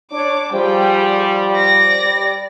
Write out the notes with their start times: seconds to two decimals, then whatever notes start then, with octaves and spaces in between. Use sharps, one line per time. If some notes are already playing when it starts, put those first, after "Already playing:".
0.12 D4 C#5 D6
0.53 F3 G3 G#4 G5
1.52 D5 A#6
2.05 G3